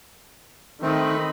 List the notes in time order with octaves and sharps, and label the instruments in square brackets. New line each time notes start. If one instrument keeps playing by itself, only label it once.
[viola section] D#3 D#5 B5 [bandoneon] A3 C4